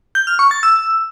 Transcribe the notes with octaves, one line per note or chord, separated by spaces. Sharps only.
G6
F6
C#6
A6
E6